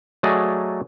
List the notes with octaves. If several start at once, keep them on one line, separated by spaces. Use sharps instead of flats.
F#3 A3 G#4 D5 D#5